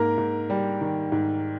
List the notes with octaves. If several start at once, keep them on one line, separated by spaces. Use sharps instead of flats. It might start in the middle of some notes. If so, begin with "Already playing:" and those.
Already playing: G#2 A#3 A#4
G#2
G3
D#3
G#2